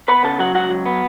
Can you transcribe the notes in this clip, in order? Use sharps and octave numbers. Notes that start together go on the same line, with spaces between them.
B3 B4 B5
C#3 A4 A5
F#3 F#4 F#5
C#2 F#4 F#5
F#3
B3